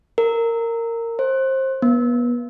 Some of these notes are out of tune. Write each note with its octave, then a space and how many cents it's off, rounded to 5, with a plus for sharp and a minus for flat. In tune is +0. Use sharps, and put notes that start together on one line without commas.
A#4 -15
C5 +25
B3 -30